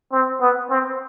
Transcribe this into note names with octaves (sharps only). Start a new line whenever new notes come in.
C4
B3
C4